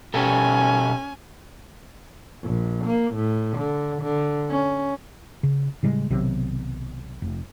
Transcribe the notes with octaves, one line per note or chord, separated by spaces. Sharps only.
B2 C#4 G4 A4 G#5
A#1
A#3
A2
D3
D3
C#4
C#3
A2 C#3 G3 G#3
B1 C3 D#3 F#3
F1